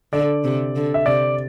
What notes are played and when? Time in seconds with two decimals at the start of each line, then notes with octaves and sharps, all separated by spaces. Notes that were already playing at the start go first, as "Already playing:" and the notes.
0.13 D3 D5
0.44 C3
0.76 D3
0.94 E5
1.06 C3 D5